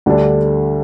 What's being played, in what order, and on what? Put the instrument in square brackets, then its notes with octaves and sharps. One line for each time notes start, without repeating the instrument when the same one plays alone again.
[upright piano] D2 D3 G3 D4